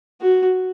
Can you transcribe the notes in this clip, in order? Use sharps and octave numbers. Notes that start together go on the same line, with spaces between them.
F#4